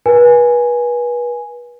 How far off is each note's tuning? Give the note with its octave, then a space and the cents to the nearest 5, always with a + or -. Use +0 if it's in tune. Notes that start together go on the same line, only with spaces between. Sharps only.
B4 -30 G#5 +0